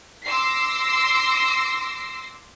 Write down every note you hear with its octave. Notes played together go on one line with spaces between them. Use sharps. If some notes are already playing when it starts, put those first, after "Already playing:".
C6 D6 E6 A#6 C7